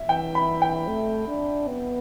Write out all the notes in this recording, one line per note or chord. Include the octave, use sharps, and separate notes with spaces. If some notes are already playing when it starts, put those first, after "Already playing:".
Already playing: E5
E3 G5
B5
G5
A3
D4
B3